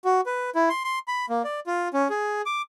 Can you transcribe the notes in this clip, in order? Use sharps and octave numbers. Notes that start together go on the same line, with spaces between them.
F#4
B4
E4
C6
C6
B5
A#3
D5
F4
C#4
G#4
D6